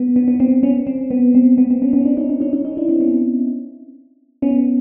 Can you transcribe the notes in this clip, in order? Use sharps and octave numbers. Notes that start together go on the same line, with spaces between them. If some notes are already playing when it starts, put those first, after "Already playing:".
Already playing: B3
B3
B3
C4
B3 C#4
C4
B3
C4
B3
C4
B3 C#4
B3 C#4
C4 D4
C#4 D#4
C4 D4
C#4 D#4
C#4 D#4
C#4 D#4
D4 E4
C4 D4
B3 C#4
B3 C#4